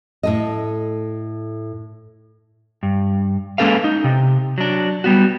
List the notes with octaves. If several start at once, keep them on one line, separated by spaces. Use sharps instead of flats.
A2 A4 D#5
G2
G#3 A#3 C#4 A4 B4 F5
D#4
C3
F#3 D4
G3 B3 F#4